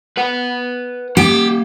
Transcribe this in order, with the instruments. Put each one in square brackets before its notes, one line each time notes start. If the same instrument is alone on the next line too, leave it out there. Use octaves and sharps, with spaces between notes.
[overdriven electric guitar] B4 F#5
[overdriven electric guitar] A#3 F#5 [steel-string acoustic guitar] G4